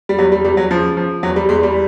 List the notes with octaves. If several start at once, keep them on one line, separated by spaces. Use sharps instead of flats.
G3
E2 F#3
G3
E2 G3
F#3
C#3 F3
F3
E2 F#3
G3
E2 G#3
G3